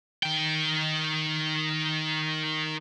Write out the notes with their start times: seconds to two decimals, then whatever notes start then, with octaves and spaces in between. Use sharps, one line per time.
0.23 D#3 G5